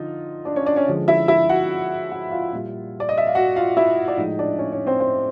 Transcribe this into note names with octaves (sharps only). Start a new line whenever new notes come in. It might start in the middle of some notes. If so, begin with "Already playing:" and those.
Already playing: D3 F3 D#4 F4
D4 D5
C#4 C#5
D4 D5
C#4 C#5
D3 F3 G#3
E4 E5
E4 E5
F#4 F#5
F#4 F#5
F4 F5
A#2 G3
D5
D#5
E5
F5
F#4 F#5
F4 F5
E4 E5
D5
A2 F3 G#3 D#4 D#5
D4 D5
C#4 C#5
C#4 C#5
C4 C5
C4 C5